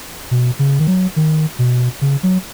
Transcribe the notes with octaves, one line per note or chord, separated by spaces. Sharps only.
B2
C#3
D#3
F#3
D#3
B2
C#3
F#3